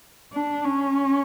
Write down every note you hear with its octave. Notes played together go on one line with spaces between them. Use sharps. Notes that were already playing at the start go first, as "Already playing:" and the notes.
D4
C#4